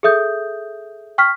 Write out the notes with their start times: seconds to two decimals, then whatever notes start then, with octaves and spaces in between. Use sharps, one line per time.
0.03 G#4 A4 E5 D#6 G6
1.18 G5 C#6 F6 B6